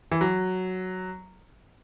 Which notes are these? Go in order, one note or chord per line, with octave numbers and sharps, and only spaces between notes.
E3
F#3